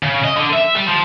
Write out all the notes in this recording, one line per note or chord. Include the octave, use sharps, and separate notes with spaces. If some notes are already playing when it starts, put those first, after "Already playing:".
C#3
D#5
D3
E5
G3
F3